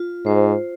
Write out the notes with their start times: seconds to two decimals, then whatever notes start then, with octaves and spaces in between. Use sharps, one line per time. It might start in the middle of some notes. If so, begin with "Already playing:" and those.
Already playing: F4
0.26 G#2 C5